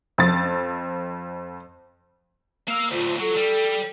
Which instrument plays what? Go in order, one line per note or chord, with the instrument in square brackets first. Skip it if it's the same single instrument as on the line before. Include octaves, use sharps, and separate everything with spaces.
[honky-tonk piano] F2 A6
[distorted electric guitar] A#3 F5 [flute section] E6
[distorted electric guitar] D2 A2 [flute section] F4 C5
[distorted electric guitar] F#3 [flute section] A4
[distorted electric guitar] G3